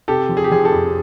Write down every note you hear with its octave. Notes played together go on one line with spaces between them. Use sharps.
C3 G4 A4
F3
G#4
G4
F3 G#4
G4 A4
F2